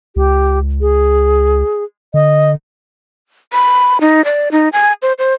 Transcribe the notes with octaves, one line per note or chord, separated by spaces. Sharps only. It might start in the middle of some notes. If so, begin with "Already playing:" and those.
C#2 G4
G#4
D3 D#5
B5
D#4
D5
D#4
G#5
C5
C5